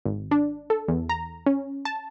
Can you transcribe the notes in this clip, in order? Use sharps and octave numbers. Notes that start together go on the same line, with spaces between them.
G#1
D4
A4
E2
A#5
C#4
A5